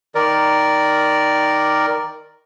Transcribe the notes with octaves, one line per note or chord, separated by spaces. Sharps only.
D#3 A#4 D5